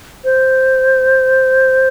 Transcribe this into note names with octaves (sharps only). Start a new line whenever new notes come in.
C5